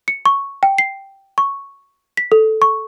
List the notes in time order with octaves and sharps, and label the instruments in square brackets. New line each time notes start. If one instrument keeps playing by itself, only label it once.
[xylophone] C#7
C#6
G5
C7
C#6
B6
A4
C#6